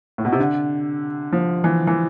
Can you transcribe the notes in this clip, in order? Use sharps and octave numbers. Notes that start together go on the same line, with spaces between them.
A2
B2
C3
D3
F3
E3
E3